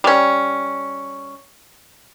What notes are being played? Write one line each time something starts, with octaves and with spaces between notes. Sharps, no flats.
G3 C#4